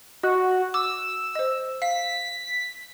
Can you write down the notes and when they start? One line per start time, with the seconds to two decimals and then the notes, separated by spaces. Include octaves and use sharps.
0.23 F#4 D#5
0.74 D6 E6
1.35 C5 D#5
1.82 F5 B6